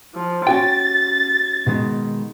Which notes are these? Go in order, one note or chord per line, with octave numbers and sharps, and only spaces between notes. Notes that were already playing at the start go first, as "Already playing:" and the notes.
F3
C#4 F#4 G5 A6
B2 D#3 G#3